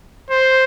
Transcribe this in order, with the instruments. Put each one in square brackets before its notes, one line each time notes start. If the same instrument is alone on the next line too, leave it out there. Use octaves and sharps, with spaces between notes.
[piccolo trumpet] C5